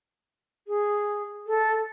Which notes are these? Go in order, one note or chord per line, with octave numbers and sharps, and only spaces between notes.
G#4
A4